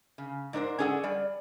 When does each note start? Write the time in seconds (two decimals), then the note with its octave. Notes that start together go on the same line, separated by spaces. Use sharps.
0.18 C#3
0.53 G#2 D4 A#4 C5
0.79 C#4 D4 G#4 A4 F#5
1.04 G3 D5